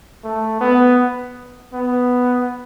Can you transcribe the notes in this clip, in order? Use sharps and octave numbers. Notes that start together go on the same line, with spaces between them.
A3
B3
B3